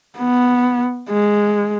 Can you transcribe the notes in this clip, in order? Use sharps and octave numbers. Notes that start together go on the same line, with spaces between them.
B3
G#3